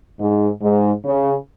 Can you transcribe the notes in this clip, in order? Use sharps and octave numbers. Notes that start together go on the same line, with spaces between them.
G#2
G#2
C#3